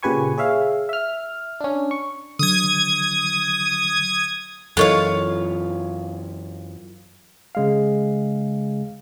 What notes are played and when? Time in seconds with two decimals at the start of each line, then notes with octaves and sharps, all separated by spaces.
0.03 A#2 C#3 G4 B4 G#5 C#6
0.38 G#4 C#5 E5 F5
0.89 E5 F6
1.61 C#4 D4
1.91 C#6
2.39 D3 F#3 D#6 G#6
4.77 F#2 E3 F4 A4 A#4 C#5 D#5 F5
7.55 C#3 G#3 F5